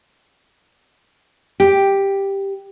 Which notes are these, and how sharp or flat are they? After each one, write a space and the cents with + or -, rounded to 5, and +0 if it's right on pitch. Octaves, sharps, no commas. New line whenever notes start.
G4 +5